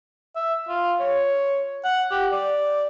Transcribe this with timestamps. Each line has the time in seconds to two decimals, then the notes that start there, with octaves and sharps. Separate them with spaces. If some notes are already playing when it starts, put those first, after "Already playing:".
0.36 E5
0.68 F4
1.00 C#5
1.84 F#5
2.11 G4
2.32 D5